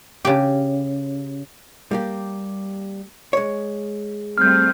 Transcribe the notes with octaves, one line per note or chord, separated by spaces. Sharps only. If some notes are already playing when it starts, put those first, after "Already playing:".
C#3 G4
G3 A#3 G4
G#3 C#5
G3 A3 C4 F6 G6